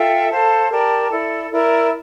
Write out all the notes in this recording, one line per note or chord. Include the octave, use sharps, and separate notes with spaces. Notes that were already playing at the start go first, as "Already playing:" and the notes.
Already playing: F4 A4 E5 G5
A4 C5 F5 A5
G4 A#4 D5 A5
E4 A4 D5
E4 A#4 D5